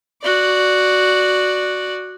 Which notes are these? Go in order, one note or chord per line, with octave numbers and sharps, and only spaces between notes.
F#4 D5